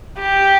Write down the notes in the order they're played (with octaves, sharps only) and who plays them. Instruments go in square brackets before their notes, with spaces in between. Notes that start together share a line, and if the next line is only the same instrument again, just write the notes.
[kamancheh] G4